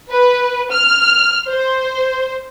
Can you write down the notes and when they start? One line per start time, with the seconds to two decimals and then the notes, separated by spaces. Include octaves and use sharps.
0.11 B4
0.72 F6
1.49 C5